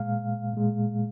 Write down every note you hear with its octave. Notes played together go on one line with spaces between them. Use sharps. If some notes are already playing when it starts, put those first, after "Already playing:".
Already playing: A#2 G#3 F5
A#2 G#3